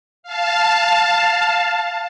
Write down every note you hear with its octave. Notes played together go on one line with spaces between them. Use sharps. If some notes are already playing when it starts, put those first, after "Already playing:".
F5 A5